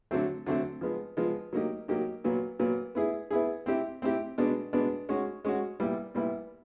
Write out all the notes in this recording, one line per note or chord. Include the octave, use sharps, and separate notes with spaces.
D3 F#3 A3 C4
D3 F#3 A3 C4
F3 G#3 B3
F3 G#3 B3
F#3 A#3 D#4 G4
F#3 A#3 D#4 G4
A#2 F#3 B3
A#2 F#3 B3
B3 E4 G#4
B3 E4 G#4
C4 E4 G4
C4 E4 G4
B2 G#3 B3 D4
B2 G#3 B3 D4
G#3 C#4 F#4
G#3 C#4 F#4
A#2 G3 B3 E4
A#2 G3 B3 E4